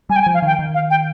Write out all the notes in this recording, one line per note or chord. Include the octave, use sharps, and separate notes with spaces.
G3 G#5
G5
G#5
F3
F5
D#3 G5
D#3
F5
G5